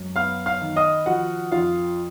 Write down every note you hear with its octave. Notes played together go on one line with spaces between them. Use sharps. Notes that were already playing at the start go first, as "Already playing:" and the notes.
Already playing: F#2 G#3
B3 F5 F6
F5 F6
D#3
D#5 D#6
F3 F#4 F#5
F2 F4 F5